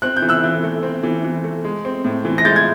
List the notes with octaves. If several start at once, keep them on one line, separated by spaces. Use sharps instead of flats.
C4 F#6
G6
E3
E6 F#6
E3
A3
C4
E3
E3
A3
G#3
C4
A2
E3
A#6
G#3 G6 A6
G#6